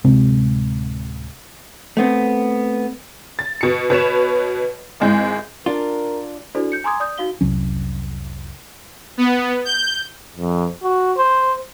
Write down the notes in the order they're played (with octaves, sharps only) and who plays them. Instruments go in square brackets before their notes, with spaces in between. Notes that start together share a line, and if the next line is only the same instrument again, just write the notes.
[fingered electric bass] D1 C3 G#3 C4
[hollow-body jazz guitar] A3 B3 C4
[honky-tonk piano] A6
B2 C#7
B2 B4 C#5 E7
G#1 G#2 G#3 E4 G6
[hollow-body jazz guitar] D4 F4 [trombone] A#4
[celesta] D4 E4 F#4 A4 C5 D5
G6 C#7
G#5 A#5 C6 D6 D#6 G#6
D5 D#6 G6
D#4 F#4 F5 G7
[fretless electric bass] F1 C2 F#3 C#4
[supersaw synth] B3
G6
[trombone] F2
F#4
C5